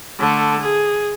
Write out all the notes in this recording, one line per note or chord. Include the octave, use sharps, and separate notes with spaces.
D3 A3
G#4